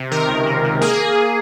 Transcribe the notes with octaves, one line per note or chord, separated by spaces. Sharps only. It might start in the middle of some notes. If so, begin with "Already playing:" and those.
Already playing: C3
D#3 A#4
C#2
C3
C#2
A#3 G#4